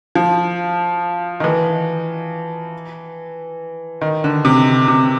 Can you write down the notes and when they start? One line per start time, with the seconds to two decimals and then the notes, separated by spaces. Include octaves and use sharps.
0.15 F3
1.40 D#3
1.44 E3
4.01 D#3
4.24 D3
4.45 C3
4.88 C3